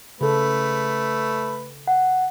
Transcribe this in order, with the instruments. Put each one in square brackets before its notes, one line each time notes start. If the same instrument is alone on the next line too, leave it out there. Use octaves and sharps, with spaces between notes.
[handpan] C#3 A4 [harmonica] A3 B4
[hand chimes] F#5